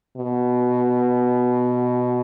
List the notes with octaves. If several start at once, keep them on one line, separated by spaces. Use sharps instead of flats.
B2